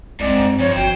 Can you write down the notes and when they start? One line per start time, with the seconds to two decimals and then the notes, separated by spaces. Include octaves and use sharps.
0.20 C2 G#2 C4 D5
0.38 G2
0.60 F2 C#5
0.76 G#1 F#4 C5 G5